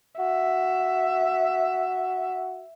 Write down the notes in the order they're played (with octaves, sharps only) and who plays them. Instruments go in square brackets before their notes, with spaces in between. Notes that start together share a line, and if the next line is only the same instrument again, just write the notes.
[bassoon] F#4 [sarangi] E5